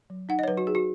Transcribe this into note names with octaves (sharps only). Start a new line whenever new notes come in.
F#3
D#4 F#5
D#5
C#5
F#3 B4
F#4
D#4 G#4
F#4